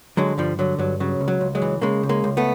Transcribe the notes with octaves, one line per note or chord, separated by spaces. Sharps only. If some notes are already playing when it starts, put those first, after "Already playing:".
D3 F#3 G#3
G2 F3 G3
D3 F#3
G2 F#3
C#3 F#3
C#2
F#3
C#2
F#3 G#3
E3
C#3 G#3 A#3
C#2
G#3 A#3
C#2
A3 B3